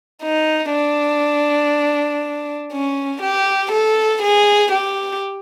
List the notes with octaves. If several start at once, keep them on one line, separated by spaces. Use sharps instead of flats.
D#4
D4
C#4
G4
A4
G#4
G4